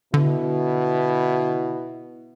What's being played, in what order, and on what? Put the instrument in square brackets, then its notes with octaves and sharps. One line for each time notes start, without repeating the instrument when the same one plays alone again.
[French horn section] B2 E4 [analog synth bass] D3